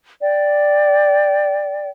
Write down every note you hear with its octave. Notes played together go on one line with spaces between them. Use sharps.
D5 G5